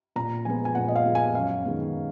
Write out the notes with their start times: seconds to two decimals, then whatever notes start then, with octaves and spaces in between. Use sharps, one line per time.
0.16 A#2 A#5
0.45 F3 G#3 B3 G#5
0.65 G#5
0.75 A#2 F#5
0.88 D#5
0.95 F5
1.05 F3 G#3 B3
1.15 G#5
1.35 F#2 F5
1.65 D#3 G#3 B3